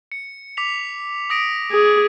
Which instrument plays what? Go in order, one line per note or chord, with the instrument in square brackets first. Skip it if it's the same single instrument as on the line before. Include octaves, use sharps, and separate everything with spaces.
[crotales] C#7
D6 B6 F7
D#6 A#6 D7
[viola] G#4